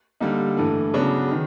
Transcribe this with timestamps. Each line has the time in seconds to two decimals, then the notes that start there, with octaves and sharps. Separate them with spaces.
0.20 D3 G3 A#3 D#4
0.57 G2 E3 A3
0.94 C#3 F#3 B3 D4
1.31 D#3